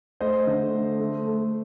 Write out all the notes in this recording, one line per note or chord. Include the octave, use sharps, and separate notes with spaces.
A3 C5 D#5
D3
A3
A3
A3